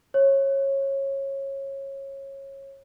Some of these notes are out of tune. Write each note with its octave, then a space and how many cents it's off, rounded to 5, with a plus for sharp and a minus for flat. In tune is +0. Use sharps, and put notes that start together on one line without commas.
C#5 -20